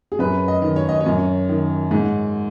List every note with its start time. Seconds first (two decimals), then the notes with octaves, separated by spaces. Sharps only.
0.12 G#4
0.19 F#2 B4
0.48 D#5
0.62 D#3
0.76 C#5
0.89 D#5
1.01 C#5
1.06 F#2
1.49 D#3
1.91 G#2